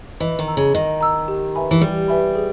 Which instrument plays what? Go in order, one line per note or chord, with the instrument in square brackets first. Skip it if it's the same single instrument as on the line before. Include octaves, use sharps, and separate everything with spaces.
[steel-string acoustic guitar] E3 [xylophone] D#5
[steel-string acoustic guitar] D#3
[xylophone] A#5 E6
[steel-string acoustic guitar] C#3
[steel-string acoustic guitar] D#3 [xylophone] D#5
[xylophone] A#5 E6
G4
B4 E5 G#5 B5
[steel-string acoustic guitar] E3
[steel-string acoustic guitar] G3 [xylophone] G4
[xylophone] B4 E5 G#5 B5
G#4